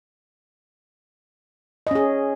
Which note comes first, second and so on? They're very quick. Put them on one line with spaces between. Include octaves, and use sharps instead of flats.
D#5 C#4 G#4